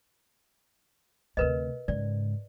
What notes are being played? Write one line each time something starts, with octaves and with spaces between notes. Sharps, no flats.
D2 C3 A#4 B4 D#5
G#2 C#3 D5